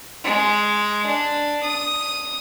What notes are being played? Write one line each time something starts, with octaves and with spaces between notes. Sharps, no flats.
G#3
D4
D#6